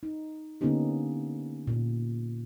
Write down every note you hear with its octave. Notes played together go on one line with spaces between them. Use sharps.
D#4
D3 A#3 B3 C#4 D#4 G4
A#2